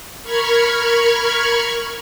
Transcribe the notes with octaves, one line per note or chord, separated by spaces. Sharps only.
A#4 B5 C#6 F6 G#6